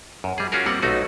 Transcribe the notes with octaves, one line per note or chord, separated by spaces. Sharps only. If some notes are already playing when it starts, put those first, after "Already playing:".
F#2
G3 G#4
C#4 F4 F#4 G#4 A#4
G3 A#3 C4 F#5
B1 A3 D#4 F#4